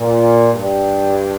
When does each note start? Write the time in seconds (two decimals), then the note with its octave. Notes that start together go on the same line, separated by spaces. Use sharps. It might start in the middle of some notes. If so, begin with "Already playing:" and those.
Already playing: A#2
0.53 G2